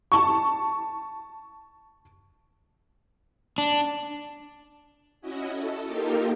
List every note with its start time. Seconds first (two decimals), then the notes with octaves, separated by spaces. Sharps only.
0.12 A5 C#6
3.58 D4
5.21 C#4 E4 F#4 D#5
5.51 A4
5.84 A#3 D#4 F4 G4 A4 A#4